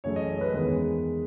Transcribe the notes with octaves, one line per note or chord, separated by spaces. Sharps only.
F#2 C#3 E3 A3 C#5
D#5
C#5
B4
E2 D#3 G#3 B4